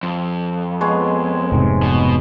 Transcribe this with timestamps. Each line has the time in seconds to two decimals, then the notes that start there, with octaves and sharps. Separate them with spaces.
0.03 F2
0.81 G#3 B3 C#5
1.52 F1 G#2 C3
1.83 B2